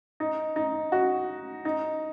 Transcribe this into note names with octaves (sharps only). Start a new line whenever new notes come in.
D#4
D#4
F#4
D#4